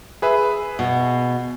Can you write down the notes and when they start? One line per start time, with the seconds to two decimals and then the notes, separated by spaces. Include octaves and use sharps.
0.22 G#4 B4 E5
0.79 B2